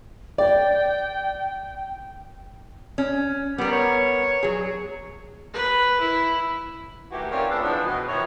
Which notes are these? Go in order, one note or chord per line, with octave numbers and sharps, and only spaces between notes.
D5 G5
C#4
G3 B3 A#4
C#5
F#3 G#4
B4
E4
D#3 E3 A3 F#4 G4
C4 C#4 F4 A#4 C#5 D5
A3 B3 D4 F4 G#4 A4
E3 F3 G#3 B3 D4
B2
D#3 F3 E4 B4 C#5